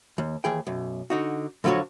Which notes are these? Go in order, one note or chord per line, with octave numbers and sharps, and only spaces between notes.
D#2
D#2 E3 G#4 G5
B1 F#2
D3 D#4 F#4
F2 D3 F#3 F4 F#4 C#5